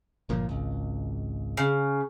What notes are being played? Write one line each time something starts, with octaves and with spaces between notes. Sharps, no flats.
G1 A#2 F3
G#1 C#2
C#3